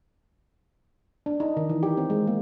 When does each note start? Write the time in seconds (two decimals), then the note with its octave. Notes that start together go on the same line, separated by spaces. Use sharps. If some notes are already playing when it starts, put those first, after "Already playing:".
1.26 D4
1.40 D#4
1.57 D#3
1.70 E3
1.83 G4
1.98 C4
2.10 G#3
2.27 A#3